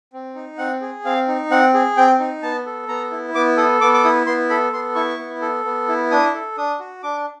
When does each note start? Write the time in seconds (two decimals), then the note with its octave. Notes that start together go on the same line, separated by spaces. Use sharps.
0.13 C4
0.35 D#4
0.58 C4 F#5
0.81 G#4
1.05 C4 F5
1.28 D#4
1.50 C4 F#5
1.74 G#4
1.97 C4 G5
2.19 D#4
2.42 B3 A5
2.66 A4
2.88 B3 A#5
3.11 E4
3.34 B3 D6
3.57 A4 D#6
3.81 B3 D6
3.94 D6
4.04 E4 D#6
4.26 B3 C6
4.49 A4 B5
4.73 B3 C6
4.95 E4 C#6
5.19 B3
5.42 A4
5.65 B3
5.88 E4
6.11 D4 D#6
6.34 A4
6.57 D4 D#6
6.80 F#4
7.03 D4 D6